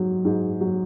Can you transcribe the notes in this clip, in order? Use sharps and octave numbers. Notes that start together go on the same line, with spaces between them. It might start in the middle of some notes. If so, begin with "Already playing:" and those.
Already playing: G#2 F#3
G#2
F#3